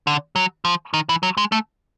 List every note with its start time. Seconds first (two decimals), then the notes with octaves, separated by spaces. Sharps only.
0.07 D3
0.36 F#3
0.65 F3
0.94 D#3
1.09 E3
1.23 F#3
1.37 G#3
1.52 A3